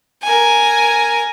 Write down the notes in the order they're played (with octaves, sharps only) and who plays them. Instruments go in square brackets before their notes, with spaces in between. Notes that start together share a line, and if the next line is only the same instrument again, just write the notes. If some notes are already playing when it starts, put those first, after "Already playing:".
[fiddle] A#4 G#5